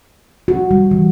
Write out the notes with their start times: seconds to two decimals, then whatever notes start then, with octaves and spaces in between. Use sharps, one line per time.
0.48 F#4
0.71 G3
0.91 E3